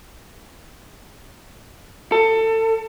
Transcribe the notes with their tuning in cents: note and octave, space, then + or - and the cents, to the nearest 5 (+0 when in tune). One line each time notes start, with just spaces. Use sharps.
A4 +25